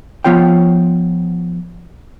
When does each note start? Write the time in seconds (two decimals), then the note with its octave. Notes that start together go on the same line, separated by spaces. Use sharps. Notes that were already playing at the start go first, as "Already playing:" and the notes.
0.24 F3 B3 F4 C#5 G5